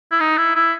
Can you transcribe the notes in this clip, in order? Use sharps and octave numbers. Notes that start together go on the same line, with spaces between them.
E4
D#4
E4
E4